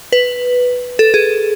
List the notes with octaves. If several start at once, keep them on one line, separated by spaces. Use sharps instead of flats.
B4
A4
G#4